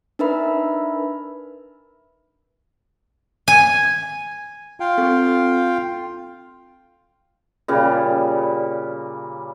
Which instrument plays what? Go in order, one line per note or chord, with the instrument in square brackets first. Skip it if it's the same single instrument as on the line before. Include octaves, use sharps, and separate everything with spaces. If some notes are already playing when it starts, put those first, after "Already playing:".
[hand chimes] D4 D#4 A#4 B4 E5 B5
[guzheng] G#5
[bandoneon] F4 F5 G5
[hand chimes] C4 A4
[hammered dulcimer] A#2 C#3 G3